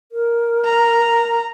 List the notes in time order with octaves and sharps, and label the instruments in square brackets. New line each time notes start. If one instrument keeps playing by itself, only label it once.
[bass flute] A#4
[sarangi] A#5